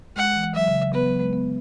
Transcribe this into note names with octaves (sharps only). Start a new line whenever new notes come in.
G#3 F#5
E3
F#3 E5
C#3
F#3
B3 B4
F#3
G#3
B3